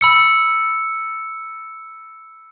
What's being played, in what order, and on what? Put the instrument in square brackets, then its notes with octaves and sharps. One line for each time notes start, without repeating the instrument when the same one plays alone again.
[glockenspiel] B5 E6 C#7